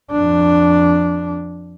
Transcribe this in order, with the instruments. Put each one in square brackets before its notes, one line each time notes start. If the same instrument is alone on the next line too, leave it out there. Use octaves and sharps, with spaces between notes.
[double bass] F2 D4